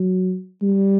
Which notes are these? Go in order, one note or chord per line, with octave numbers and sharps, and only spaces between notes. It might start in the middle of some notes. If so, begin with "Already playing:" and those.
Already playing: F#3
G3